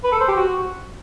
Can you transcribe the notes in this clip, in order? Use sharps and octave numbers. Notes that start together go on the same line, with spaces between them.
B4
A4
C5
G4
F#4